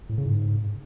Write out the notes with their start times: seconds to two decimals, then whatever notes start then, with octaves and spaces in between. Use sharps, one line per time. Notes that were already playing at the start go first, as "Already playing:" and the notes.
0.09 A2
0.18 C#3
0.26 G#2